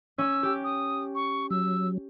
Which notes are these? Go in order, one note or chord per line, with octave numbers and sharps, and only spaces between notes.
C#4 E6
G4
D#6
C#6
F#3 E6